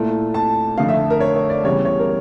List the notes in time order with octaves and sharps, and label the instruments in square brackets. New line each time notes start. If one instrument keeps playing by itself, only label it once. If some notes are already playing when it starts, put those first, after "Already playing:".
Already playing: [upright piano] A#2 A3 E4
A5
F2 D3 A3 F5
E5
A#4
C#5
C#5
D5
E2 C#3 G3 C#5
C#5
A#4